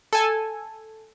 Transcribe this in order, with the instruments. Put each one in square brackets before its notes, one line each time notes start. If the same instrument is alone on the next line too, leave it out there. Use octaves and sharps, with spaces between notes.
[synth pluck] A4 G#5